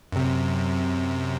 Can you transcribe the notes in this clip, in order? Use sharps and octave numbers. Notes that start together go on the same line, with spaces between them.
F#2 C3